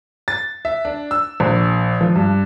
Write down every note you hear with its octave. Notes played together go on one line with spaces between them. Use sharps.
A6
E5
D4
E6
A#1
F3
G2